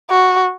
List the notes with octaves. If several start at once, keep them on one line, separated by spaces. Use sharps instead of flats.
F#4